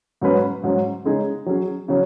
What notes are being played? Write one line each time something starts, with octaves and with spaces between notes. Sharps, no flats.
G#2 F#3 C#4 B4
G#2 F#3 C#4
C#3 G#3 D#4 G#4
F#3 C#4 G#4
C#3 F#3